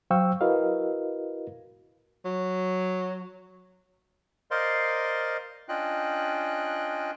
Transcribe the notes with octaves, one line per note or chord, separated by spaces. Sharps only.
F#3 C5 F5 G5 C#6 E6
E4 F#4 A#4 B4 D#5 F5
F#3
A#4 C5 D5 D#5 F5 C6
C#4 D4 F4 D#5 G5 F#6